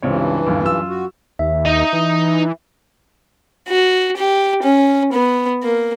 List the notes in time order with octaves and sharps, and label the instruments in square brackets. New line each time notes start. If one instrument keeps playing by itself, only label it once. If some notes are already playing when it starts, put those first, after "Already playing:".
[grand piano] C#2 C4 C#5 [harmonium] G2 E3
[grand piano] G1 D#2
F#2 F4 E6
[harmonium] F#4
[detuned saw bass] D#2 [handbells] E5
[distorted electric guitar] D#4 D#5
[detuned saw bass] E3
[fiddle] F#4
G4
C#4
B3
A#3